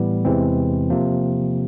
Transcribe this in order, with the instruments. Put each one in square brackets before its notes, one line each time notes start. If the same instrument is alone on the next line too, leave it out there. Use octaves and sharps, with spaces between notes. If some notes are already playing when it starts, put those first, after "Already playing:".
Already playing: [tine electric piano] A2 E3 G3 B3
E2 C3 E3 G#3 C4
C3 F3 A#3